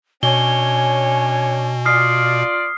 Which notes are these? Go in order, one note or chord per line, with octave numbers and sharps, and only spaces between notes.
B2 C#4 D4 C#5 G#5 G7
F4 D5 D#6 F6 C7